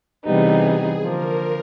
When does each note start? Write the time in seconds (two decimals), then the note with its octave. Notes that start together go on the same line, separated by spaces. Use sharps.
0.24 C3 E3 G3 B3 D#4 G#4
1.01 D3 F3 A#3 A#4